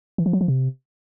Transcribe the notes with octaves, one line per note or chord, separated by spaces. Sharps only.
E3
F3
F#3
F3
C3